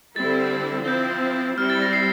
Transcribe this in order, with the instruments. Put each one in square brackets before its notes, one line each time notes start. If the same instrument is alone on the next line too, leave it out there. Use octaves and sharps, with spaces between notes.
[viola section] D3 G3 C4 E4 [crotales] A6
[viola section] F3 C4 E4 [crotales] G6
[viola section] G3 C4 E4 [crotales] F6
[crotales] A6
A#6
C7